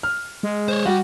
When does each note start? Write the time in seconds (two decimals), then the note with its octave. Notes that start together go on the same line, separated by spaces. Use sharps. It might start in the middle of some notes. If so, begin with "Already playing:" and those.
0.03 F6
0.43 G#3
0.68 C5 C#5
0.85 G3 F#4